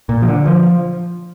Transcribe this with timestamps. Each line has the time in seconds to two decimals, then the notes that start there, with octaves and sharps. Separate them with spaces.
0.09 A#2
0.22 F3
0.28 D3
0.47 F3